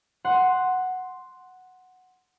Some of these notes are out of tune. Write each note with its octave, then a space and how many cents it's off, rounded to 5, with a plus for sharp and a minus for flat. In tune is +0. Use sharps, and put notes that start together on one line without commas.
F#5 +0 C6 +0